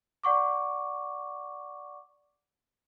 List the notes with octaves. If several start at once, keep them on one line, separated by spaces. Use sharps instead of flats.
D5 F#5 C#6 D6